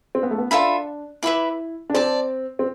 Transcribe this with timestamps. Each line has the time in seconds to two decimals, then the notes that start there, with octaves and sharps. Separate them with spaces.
0.15 C4
0.23 B3
0.31 A3
0.38 B3
0.51 D4 F4 A4 E5 B5
1.23 E4 B4 E5 B5 D6
1.90 D4
1.94 C4 D5 A5 D6
2.59 C4